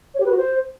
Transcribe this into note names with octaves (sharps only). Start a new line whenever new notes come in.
C#5
G4
B4
F#4
C5